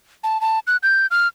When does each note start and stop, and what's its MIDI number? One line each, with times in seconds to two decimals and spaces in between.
0.24 0.40 81
0.41 0.59 81
0.67 0.77 90
0.83 1.07 91
1.11 1.28 89